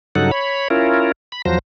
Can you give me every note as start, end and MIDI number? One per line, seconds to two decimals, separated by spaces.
0.15 0.31 43
0.15 0.31 49
0.15 0.31 54
0.15 0.31 63
0.15 0.31 69
0.15 0.31 78
0.31 0.68 73
0.31 0.68 83
0.70 1.12 61
0.70 1.12 64
0.70 1.12 65
0.70 1.12 70
1.32 1.42 83
1.45 1.59 40
1.45 1.59 53
1.45 1.59 54
1.45 1.59 72
1.45 1.59 94